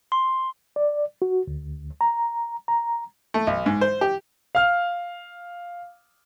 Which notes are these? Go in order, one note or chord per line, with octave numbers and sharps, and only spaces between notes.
C6
D5
F#4
D2
A#5
A#5
A3
B1
G#2
C5
G4
F5 F6